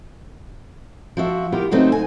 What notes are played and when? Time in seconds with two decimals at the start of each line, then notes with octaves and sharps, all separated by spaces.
1.17 F3 F#4 E5
1.52 B3 E4 F4 G4 A#4
1.71 C#3 F#3 A3 B3 C4 D#4
1.92 G#5